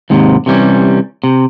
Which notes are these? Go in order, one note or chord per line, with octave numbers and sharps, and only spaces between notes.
D#2 G#2 C3
C3 E3 G3 C#4
C3